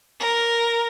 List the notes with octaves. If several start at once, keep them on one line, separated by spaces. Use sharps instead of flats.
A#4